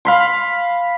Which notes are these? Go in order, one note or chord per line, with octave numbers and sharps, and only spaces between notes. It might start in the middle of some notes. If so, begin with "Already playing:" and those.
F5 B5 C6